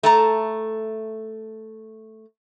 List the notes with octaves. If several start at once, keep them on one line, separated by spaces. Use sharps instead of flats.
A3 A5 A#5